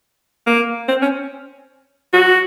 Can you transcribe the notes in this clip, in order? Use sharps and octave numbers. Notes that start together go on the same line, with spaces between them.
A#3
C4
C#4
F#4